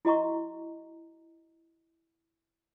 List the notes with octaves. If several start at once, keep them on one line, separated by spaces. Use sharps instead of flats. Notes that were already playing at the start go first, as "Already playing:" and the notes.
E4 F#4 D#5 A#5 C#6